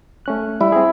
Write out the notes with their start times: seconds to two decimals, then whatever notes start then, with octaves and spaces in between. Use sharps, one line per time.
0.26 A3 C#4 F#6
0.60 G3 E4
0.72 C4 G#4